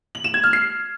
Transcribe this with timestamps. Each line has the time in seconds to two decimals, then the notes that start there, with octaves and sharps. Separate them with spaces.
0.15 F#7
0.24 E7
0.34 G#6
0.44 F6
0.53 C7